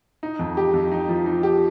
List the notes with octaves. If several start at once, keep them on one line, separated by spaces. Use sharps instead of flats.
D#4
F2
G4
F2
D#4
F3
D#4
G4